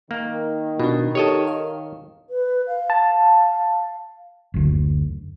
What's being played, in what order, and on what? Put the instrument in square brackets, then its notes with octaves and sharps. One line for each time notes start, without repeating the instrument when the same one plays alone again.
[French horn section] D#3 [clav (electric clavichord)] A#3
[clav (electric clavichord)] B2 [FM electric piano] D4 F4
[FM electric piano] G4 A4 [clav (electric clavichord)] C#5 D#5 A5
[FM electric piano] F5
[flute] B4
F5
[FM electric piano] A5
[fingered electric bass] F#1 D2